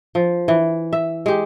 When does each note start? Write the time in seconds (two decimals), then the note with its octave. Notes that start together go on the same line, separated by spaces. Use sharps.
0.15 F3
0.48 E3
0.93 E5
1.26 G#3 G4